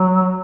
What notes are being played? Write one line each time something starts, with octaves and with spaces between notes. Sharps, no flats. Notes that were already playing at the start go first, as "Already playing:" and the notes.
Already playing: F#3